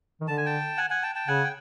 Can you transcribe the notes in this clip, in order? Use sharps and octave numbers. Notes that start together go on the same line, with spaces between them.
D#3
D3 A5
G#5
G5 A5
F#5 G#5
F#5 G#5
G5 A5
G5 A5
C#3 F#5 G#5
G5